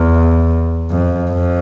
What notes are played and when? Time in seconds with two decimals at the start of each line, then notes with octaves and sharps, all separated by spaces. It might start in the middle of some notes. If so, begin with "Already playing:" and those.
Already playing: E2
0.90 F2
1.31 F2